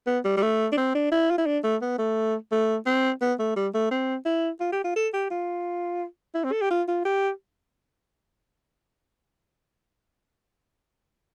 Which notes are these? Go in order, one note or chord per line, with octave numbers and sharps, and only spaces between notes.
B3
G3
G3
A3
D4
C4
D4
E4
F4
E4
D4
A3
B3
A3
A3
C4
B3
A3
G3
A3
C4
E4
F4
G4
F4
A4
G4
F4
E4
C4
A4
G4
F4
F4
G4